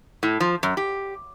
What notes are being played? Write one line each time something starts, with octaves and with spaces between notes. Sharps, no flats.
A2
F3
F#2
G4